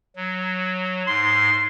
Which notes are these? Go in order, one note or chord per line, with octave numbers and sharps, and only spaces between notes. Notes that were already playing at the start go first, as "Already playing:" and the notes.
F#3
G#2 C6